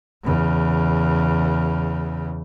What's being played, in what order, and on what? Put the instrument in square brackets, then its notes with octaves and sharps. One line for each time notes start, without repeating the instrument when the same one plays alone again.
[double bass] E2 C#3